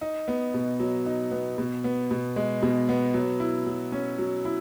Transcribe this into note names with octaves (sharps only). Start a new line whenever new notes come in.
D#4
B3
B2
F#3
D#4
B3
B2
B3
B2
G#3
B2
B3
F#3
E4
F#3
C#4
F#3
E4